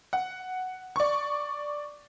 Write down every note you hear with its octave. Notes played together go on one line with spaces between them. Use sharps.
F#5
D5 C#6